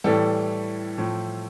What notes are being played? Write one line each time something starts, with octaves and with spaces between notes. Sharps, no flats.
A2 E3 G3 A4
A2 F3